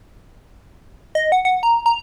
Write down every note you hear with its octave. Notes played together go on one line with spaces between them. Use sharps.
D#5
F#5
F#5
A#5
A#5